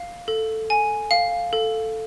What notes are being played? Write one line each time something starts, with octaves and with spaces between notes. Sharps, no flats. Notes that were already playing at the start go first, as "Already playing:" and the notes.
Already playing: F5
A4
G#5
F5
A4